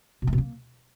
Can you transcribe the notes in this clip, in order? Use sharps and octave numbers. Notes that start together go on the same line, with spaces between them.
B2
A3
B2
A#3